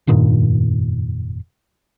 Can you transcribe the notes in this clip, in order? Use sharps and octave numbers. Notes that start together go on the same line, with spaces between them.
F1 G2 A#2 D#3